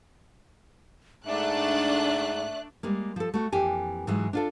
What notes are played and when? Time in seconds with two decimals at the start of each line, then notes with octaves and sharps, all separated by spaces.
1.26 G#2 A3 D4 E5 F#6
2.83 G3 G#3 A#3
3.16 F3 A4
3.34 A3 F#4
3.52 F2 E3 A#3 G4 G#5
4.07 G#2 E3 F#3 G#3
4.33 D4 F4 A4